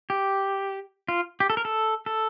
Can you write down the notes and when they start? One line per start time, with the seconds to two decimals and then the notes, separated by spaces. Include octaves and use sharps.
0.10 G4
1.08 F4
1.40 G4
1.50 A4
1.57 A#4
1.65 A4
2.06 A4